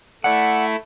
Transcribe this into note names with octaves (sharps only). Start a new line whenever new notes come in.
A3 E4 D5 F#5